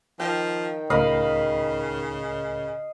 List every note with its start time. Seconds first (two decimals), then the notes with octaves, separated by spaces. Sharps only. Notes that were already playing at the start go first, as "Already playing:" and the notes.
0.20 D#3 F3 G5
0.90 C#2 A2 C#3 A#4 D#5 F5 B5